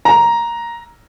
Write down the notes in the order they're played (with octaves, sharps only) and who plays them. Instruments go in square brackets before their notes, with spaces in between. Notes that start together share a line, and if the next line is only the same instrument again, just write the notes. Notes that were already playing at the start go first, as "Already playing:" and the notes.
[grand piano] A#5